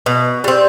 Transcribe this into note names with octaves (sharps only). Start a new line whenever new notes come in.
B2
G3 C4